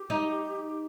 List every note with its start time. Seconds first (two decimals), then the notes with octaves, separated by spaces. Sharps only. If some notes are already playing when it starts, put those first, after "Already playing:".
Already playing: G4
0.10 D#4